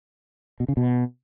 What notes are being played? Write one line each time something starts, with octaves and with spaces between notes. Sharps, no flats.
B2
C#3
B2